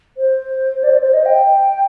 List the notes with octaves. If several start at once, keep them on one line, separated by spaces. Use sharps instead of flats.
C5
D5
C5
C5
D#5
G5